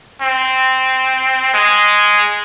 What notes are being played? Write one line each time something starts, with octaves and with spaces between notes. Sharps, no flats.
C4
G#3